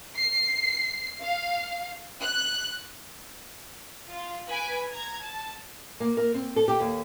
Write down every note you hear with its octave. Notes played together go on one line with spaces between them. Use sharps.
C7
F5
F#6
F4
B4 G#5 D7
A#5 G#6
A5
A#3
A#4
C4
A4
G4
D#2